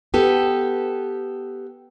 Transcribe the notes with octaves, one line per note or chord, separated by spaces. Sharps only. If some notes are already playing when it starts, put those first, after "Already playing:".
B3 G4 A4